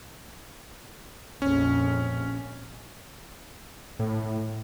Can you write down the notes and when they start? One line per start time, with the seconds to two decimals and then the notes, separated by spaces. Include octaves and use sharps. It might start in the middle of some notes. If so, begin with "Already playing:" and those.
1.42 A#1 F2 C#4
3.99 A2